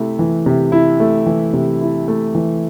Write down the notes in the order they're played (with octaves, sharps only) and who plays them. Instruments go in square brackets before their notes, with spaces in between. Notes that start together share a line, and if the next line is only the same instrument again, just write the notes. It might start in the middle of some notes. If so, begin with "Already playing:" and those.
Already playing: [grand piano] C3 A3 E4
E3
C3
E4
A3
E3
C3
E4
A3
E3